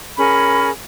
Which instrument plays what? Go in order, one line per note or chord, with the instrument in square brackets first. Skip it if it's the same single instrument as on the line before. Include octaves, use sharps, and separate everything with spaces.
[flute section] C#4 G#4 A#4 B5